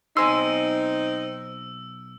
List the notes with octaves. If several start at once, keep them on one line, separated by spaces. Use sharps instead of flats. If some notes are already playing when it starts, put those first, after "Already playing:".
B1 C4 D#4 G#5 C6 E6